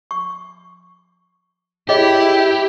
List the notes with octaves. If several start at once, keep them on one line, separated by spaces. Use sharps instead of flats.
C#6
E4 G4 G#4 C#5 D#5